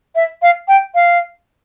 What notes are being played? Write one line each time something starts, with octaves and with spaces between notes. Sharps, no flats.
E5
F5
G5
F5